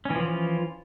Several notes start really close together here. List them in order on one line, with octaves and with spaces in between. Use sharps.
C#4 E3 F3 F4